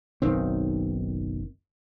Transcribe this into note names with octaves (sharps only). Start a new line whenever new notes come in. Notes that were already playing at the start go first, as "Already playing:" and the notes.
F#1 B1 D#3 C4